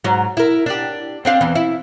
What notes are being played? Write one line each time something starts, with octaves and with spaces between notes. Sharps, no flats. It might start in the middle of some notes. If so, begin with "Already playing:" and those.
G#2 F#3
E4 A#4
D4 G4
C4 D4 F5
E2 E3
E4